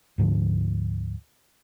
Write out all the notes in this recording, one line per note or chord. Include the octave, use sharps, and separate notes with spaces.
D2 G#2 D3 F3